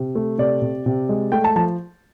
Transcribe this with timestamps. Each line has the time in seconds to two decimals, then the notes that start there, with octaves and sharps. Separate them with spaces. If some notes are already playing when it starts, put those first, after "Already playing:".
Already playing: C3
0.15 A3
0.38 C3 D5
0.62 C3
0.86 C3
1.09 G#3
1.32 A3 G5
1.44 A5
1.56 F3 A5